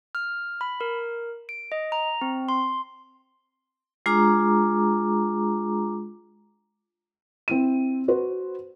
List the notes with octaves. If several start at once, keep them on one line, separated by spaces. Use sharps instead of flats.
F6
B5
A#4
D7
D#5
A#5
C4
C6
G#3 D4 F4 G#4 A#5 D6
C4 E4 D#7
F#4 B4 C5